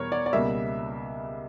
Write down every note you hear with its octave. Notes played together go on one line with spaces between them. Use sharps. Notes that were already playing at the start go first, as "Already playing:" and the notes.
Already playing: E2 B2 G3 A#4 C#5
D5
D5
C#2 B2 G3 A#3 E5